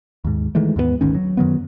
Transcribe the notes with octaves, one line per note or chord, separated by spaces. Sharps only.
D#2 G#2
D#3 E3 G#3 A3
D#2 G#2 G3 B3
G#1 D2 D#3 C#4
F#3
F#2 D#3 F#3 B3